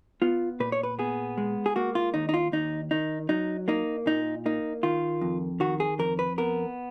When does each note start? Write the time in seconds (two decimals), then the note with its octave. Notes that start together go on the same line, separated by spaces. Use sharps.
0.22 B3 F4
0.60 A#2 B4
0.72 C#5
0.83 B4
0.99 B3 G#4
1.38 G#3
1.66 G#4
1.76 A#3 F#4
1.95 F4
2.14 D#2 D#4
2.29 D#4
2.34 F4
2.52 D#2 D#4
2.91 D#3 D#4
3.29 F#3 D#4
3.68 A#3 D#4
4.06 A#2 D#4
4.46 A#3 D#4
4.83 D#3 F4
5.22 F2
5.60 D#3 F#4
5.80 G#4
5.99 F2 A#4
6.19 B4
6.38 B3 A#4